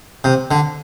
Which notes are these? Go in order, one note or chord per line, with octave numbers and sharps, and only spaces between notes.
C3
D3